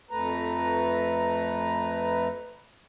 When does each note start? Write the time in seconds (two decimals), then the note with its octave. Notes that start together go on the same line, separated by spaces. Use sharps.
0.11 F2 A3 B4 A#5